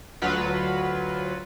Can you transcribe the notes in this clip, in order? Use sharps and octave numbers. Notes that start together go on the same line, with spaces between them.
D2 F#3 F4 B4